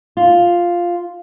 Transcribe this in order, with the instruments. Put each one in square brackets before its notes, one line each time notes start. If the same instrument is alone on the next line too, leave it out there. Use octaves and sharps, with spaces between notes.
[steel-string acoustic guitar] F4